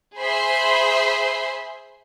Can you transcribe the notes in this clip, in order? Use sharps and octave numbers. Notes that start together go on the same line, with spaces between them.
G#4 C5 E5 B5 C6